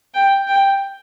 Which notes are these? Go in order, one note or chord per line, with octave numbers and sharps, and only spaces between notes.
G5
G5